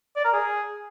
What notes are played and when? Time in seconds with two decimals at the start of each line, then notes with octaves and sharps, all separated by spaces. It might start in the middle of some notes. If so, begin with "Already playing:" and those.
0.16 D5
0.25 A#4
0.33 G#4